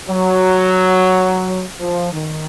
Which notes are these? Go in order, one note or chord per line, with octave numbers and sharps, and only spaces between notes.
F#3
F3
D#3